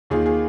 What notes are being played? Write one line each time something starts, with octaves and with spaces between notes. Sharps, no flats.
D#2 D#3 A#3 F4 G#4
G#4